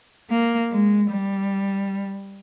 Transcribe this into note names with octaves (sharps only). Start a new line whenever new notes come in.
A#3
G#3
G3